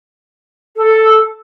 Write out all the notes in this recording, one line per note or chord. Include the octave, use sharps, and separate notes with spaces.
A4